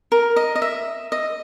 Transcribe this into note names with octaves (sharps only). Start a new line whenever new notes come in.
A#4
D#5
D#5
E5
D#5